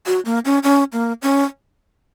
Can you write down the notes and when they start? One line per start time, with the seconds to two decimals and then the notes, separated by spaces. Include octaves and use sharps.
0.06 F#4
0.25 A#3
0.45 C#4
0.63 C#4
0.93 A#3
1.22 C#4